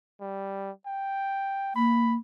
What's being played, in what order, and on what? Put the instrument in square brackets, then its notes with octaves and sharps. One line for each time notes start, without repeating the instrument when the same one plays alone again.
[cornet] G3
G5
[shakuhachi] A#3 [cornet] B5